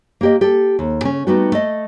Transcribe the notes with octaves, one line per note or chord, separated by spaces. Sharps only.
A#3 G4 D#5
G4 A4
D#2
C#3 C#4
G3 A3 B3 D#4 F#4
A3 D#5